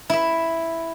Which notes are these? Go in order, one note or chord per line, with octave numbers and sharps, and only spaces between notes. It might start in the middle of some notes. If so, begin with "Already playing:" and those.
E4 E5